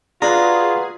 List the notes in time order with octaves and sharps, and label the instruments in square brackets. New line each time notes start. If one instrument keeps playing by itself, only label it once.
[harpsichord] D4 [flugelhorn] F4 [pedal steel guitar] F#4 B4 A#5 [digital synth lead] G#4